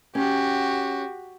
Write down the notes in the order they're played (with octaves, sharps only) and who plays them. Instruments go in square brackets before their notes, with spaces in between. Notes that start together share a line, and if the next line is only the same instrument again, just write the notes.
[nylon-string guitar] C#4 [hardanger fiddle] F#4 G4